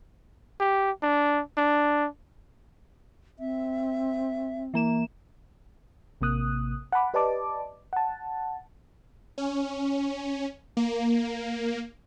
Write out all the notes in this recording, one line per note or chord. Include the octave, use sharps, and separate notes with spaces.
G4
D4
D4
C4 E5
E3 A#3 E7
A1 C3 A#3 D#6 F#6
F#5 A5 B5 D6
G4 B4 D5 D#5 A5 D6
F#5 A5
C#4
A#3